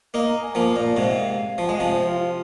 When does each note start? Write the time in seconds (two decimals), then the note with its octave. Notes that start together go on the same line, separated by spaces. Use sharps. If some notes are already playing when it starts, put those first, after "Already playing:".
0.14 A#3 D#4 F5
0.28 A#5
0.42 G#5
0.55 F3 A#3 F5
0.76 A#2
0.97 G#2 C3
1.58 F3
1.67 G#3 G#5
1.79 C3 F3 F5
1.93 C5
2.06 F4
2.20 F4